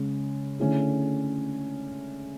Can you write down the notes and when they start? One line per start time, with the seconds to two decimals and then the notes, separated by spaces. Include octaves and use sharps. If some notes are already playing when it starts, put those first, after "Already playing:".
Already playing: C#3 G#3 C#4 G#4
0.59 D3 A3 C#4 E4 G#4